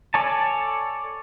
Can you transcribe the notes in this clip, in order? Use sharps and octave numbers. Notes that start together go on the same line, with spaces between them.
A4 C#5 D5 G#5 A5